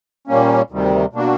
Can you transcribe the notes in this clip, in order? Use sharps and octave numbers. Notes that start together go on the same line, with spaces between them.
A#2 G3 A#3 C#4
D2 C3 D#3 G3
B2 G3 A#3 D4 F#4